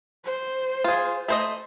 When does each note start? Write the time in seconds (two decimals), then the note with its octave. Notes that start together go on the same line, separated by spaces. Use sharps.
0.24 C5
0.84 F4 G#4
1.28 A3 C5 D#5